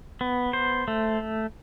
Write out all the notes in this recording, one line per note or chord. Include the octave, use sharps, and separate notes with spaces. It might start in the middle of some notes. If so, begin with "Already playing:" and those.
B3
C5
A3